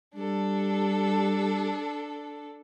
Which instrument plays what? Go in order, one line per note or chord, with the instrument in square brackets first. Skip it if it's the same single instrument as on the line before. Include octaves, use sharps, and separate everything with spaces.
[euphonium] G3 [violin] D4 A4